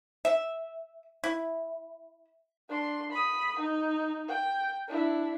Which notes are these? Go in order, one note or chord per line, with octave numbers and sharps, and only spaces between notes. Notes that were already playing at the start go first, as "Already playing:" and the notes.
E5
E4
D4 C6
B5 D#6
D#4
G5
D4 E4